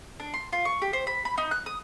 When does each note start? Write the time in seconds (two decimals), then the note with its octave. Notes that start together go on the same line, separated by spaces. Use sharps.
0.20 D4
0.34 C6
0.53 F4
0.65 C#6
0.82 G4
0.93 C5
1.07 B5
1.25 B5
1.38 D#4
1.51 F#6
1.66 D#6